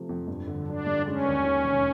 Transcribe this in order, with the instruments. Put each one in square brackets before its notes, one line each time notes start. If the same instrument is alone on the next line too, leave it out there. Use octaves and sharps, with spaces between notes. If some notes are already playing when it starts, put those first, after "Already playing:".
Already playing: [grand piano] C3 F3 A3
F2
G2
D3
[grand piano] F#3 [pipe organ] D4
[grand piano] G2
[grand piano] G#3 [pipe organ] C#4
[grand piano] D#2
D#3
E1